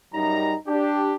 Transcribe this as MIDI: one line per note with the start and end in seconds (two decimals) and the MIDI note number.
0.14 0.55 42
0.14 0.55 55
0.14 0.55 63
0.14 0.55 82
0.68 1.16 62
0.68 1.16 67